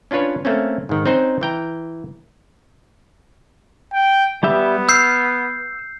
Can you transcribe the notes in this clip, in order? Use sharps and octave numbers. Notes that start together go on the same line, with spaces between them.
C#4 D4 F4 B4 C#5
A3 A#3 C4 C#4
G#2 D#3
C4 C#4 D#4 C5 F#5
E3 G5 A#5
G5
G3 B3 G4 E5
E6 F6 G6 C7